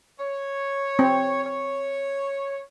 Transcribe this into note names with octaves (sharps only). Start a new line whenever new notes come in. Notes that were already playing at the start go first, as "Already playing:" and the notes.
C#5
C4
C#5